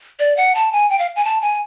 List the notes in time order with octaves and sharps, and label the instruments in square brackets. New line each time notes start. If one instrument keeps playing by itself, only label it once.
[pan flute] D5
F#5
A5
G#5
G5
F5
G#5
A5
G#5